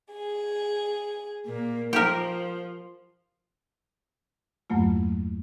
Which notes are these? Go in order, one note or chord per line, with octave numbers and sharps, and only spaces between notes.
G#4
A#2 A#3
F3 G4 A#4
E2 G2 F#3 A3 A#3 F4